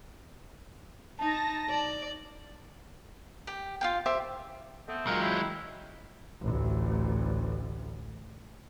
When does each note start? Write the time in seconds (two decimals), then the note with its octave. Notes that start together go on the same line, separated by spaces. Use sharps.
1.19 D#4 A5 A#6
1.70 D5
3.47 G4 G5
3.81 F4 F5 G5
4.06 G4 C5 E5
4.88 A3 B3 C4
5.07 F#3 G#3 F4 A#4 G5
5.22 E4
6.42 A1 D2